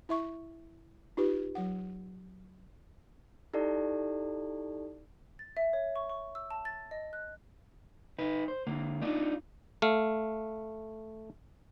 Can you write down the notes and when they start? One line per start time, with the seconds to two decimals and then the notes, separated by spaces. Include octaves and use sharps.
0.09 E4 E5 C#6
1.17 D#4 F4 G4 B4
1.55 F#3 F#5
3.53 D#4 E4 G4 A4 D5
5.39 A6
5.57 E5
5.73 C#5
5.96 C#6
6.09 C#6
6.35 E6
6.51 A5
6.65 A6
6.91 D#5
7.13 F#6
8.19 D#4 B4
8.48 C5
8.67 D3 A#3
9.02 D4 D#4 F4
9.82 A3 F5